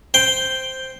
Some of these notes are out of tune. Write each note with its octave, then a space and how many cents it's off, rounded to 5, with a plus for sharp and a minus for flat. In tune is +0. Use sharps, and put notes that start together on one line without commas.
C5 +0 G5 +0